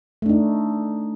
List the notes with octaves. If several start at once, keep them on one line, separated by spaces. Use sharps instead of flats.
A3 D4 D#4